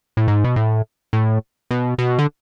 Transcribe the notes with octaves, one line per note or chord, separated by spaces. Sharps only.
A2
G#2
B2
A2
A2
B2
B2
D3